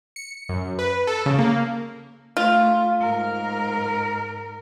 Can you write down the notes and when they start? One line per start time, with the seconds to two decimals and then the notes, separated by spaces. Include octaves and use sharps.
0.16 C#7
0.49 F#2
0.79 B4
1.07 A4
1.26 C#3
1.39 A#3
2.37 A3 F4
3.01 G#2 A#4